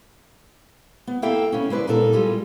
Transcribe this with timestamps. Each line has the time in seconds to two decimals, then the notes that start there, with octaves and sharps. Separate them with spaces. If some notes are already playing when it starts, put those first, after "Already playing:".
1.07 B3
1.22 A#3 E4 A4 E5 F5 G5
1.52 C#3 B3 C#4
1.70 G#3 E4 B4 D5
1.87 A#2 B3 D#4 A4
2.12 G3 G#3 F4